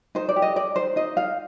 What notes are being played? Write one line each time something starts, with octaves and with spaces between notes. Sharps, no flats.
D#4 C5
D5
G4
D#5
G4 D5
D#4 C5
D#4 D#5
D#4 F5